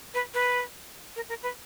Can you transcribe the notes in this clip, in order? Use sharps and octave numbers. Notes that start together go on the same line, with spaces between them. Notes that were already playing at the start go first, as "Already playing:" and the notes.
B4
B4
A#4
A#4
B4